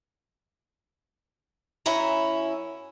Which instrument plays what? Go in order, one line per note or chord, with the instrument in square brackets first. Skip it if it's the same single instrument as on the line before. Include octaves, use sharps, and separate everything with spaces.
[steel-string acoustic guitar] F#2 C#4 E4 A#5